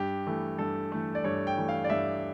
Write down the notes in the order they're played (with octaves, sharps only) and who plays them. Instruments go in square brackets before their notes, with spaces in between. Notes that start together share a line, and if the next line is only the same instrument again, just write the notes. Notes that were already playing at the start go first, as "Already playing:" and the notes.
Already playing: [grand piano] G2 G4
E3 A3
G2 A4
E3 A3
D5
G2 C#5
G5
E3 A3
F5
D5
G2 E5